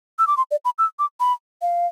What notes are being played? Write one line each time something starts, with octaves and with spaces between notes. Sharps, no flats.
E6
D6
C6
D5
B5
E6
D6
B5
F5